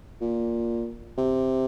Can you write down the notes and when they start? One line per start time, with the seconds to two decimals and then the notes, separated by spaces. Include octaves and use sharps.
0.21 A#2
1.17 C3